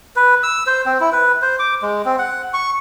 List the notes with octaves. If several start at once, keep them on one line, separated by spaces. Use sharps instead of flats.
B4
E6
C5
C4
E4
B4
C5
D6
G#3
C4
F#5
C#6